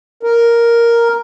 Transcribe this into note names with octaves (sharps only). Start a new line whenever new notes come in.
A#4